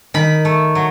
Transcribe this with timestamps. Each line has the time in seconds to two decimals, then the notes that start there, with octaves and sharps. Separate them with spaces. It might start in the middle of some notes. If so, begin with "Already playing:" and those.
0.14 D#3 B5
0.45 A3
0.75 F#3